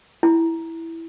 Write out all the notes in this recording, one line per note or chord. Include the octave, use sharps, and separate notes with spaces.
E4